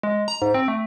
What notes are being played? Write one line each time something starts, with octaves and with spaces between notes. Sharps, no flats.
G#3
A#5
G#2
C4
A3